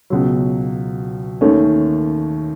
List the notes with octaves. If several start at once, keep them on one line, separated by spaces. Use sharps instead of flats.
C#2 B2 F#3
D#2 D#3 A3 C#4